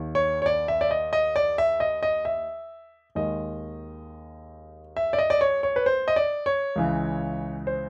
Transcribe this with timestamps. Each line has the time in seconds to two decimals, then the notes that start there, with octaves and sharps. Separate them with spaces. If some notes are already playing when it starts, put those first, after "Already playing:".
Already playing: D#2 D#3
0.15 C#5
0.42 C#5
0.46 D5
0.68 E5
0.81 D5
0.91 D#5
1.13 D#5
1.36 D5
1.58 E5
1.80 D#5
2.03 D#5
2.25 E5
3.15 D#2 D#3 G#3 D#5
4.97 E5
5.13 D5
5.18 D#5
5.30 D5
5.41 C#5
5.63 C#5
5.76 B4
5.86 C5
6.08 D#5
6.16 D5
6.46 C#5
6.76 C#2 C#3 E3
7.67 C5